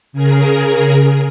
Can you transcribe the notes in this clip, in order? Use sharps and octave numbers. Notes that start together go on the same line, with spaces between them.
C#3 G#4 A#4